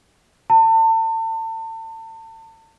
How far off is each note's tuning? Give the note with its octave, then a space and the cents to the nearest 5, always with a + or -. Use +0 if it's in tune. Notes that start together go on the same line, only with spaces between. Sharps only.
A5 +35